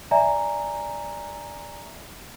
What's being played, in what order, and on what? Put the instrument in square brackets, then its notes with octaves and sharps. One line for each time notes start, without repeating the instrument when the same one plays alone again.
[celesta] D5 E5 G#5 A#5